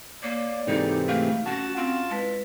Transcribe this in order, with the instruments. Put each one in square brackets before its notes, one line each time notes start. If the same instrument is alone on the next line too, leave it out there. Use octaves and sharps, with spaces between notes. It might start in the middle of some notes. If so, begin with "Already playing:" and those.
[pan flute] A#3 [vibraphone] C#5 [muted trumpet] D5
[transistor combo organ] G#2 C3 E3 [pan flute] D#4 [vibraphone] A4
[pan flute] A3 [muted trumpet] F5
[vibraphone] C#4 [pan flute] F#4 [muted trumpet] F#5 [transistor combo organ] A5
[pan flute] C4 [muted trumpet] F4
[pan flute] G#3 [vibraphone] E4 B4